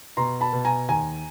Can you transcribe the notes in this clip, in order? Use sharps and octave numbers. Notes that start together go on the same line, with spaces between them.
B2 A#5 C6
A5 B5
B2
G#5 A#5
D#2 G#5 A#5